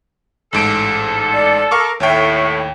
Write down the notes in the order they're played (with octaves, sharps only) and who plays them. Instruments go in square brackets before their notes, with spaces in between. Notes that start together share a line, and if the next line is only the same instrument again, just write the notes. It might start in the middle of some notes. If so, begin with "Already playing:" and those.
[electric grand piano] A1 G#2 D7 [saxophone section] A4
[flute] D5
[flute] A#4 [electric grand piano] F5 C#6 D6
[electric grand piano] D#2 G5 [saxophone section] A2 [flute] C#5